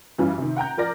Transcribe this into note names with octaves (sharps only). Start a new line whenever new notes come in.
F#2 E3 G3 C#4 F4
C3 D#3
F#5 G5 A#5 G6
F3 A#4 D5 A#6